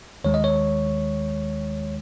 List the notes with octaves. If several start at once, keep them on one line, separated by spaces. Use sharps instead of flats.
D#2 D#3 G#3 C#5
D#5
C#5